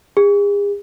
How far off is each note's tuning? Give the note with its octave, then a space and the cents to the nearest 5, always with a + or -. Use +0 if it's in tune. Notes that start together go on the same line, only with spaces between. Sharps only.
G#4 -40